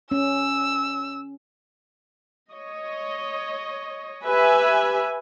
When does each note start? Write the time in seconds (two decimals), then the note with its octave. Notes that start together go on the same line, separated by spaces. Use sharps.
0.11 C#4 E6
2.52 C#5 D#5
4.26 G4 B4 E5 G#5